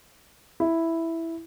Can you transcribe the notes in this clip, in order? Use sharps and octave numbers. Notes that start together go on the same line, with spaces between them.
E4